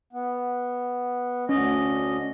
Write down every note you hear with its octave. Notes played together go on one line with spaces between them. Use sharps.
B3
D2 C#4 D#5